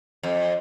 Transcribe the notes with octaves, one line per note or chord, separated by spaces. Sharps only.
F2